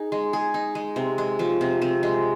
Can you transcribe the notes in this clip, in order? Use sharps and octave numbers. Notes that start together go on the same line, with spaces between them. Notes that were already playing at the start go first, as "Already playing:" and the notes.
Already playing: D#4 G#4
G#3
G#4
D#4
G#3
C3
G#3
F3
C3
C3
G#3